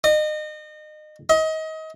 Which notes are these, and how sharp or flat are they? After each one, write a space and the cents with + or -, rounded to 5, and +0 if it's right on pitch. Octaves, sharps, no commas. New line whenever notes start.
D#5 -30
D#5 +30